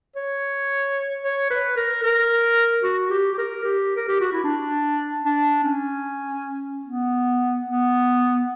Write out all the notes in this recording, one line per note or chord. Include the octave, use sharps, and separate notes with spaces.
C#5
C#5
B4
A#4
A#4
F#4
G4
G4
A#4
G4
A#4
G4
F#4
E4
D4
D4
C#4
B3
B3